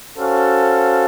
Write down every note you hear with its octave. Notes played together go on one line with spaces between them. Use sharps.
C#4 F#4 A4 C5 F5